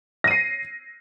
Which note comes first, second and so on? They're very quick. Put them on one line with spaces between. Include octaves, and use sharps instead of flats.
A#6 D#7 C7